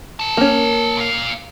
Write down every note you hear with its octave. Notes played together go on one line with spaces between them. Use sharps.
A#4 A5
A#3 C#4
A#2 F5